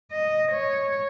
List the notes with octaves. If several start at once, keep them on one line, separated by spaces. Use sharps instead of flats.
D#5
C#5